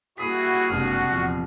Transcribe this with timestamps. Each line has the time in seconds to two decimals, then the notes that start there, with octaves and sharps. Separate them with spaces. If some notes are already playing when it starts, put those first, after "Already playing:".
0.18 G3 A#3 E4 F#4 G#4 B5 D#6 B6
0.70 F#1 C2 C3 G#3 D4 F#4 F6
1.11 D#1 E2 F3